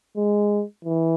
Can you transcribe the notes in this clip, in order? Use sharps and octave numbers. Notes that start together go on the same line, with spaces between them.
G#3
E3